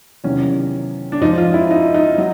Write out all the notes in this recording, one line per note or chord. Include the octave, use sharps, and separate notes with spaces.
E2 C3 D#3 F#3 C#4
D4
G#2 F3 D#4
F4
E4
D#4
D#4
F#3